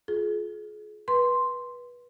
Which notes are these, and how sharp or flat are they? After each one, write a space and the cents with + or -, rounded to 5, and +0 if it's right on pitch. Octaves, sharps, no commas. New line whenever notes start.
F4 +15 G#4 +35
B4 -20 C6 +0